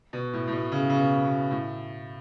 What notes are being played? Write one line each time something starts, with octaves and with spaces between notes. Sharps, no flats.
B2
A2
A2
B2
C#3
C#3
B2
B2
A2